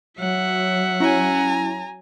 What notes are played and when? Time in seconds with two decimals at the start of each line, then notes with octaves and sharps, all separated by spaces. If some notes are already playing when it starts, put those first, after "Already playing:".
0.19 F#3 E5 F#5
1.00 C#4 E4 G#5 A#5